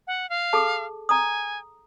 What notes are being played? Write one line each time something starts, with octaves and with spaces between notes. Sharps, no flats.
F#5
F5
G#4 A4 A5
G#5 A#5 D#6